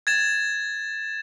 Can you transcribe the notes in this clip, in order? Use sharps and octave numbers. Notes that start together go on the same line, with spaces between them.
G#6 A6 E7